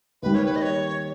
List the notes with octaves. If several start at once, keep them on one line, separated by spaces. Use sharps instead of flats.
D#2 D#3 G3 B4
C#5
B4
D#5
C#5